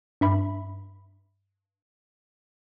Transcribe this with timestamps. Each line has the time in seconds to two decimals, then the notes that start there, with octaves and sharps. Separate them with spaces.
0.21 G2 E5 B5